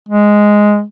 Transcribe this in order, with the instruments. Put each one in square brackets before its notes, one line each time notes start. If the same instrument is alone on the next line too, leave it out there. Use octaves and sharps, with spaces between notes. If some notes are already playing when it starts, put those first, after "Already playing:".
[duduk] G#3